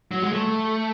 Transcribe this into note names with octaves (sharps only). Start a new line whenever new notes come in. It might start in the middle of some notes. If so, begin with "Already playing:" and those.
F#3
G#3
A3